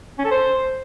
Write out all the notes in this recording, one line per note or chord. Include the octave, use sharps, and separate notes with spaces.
C#4
A4
C5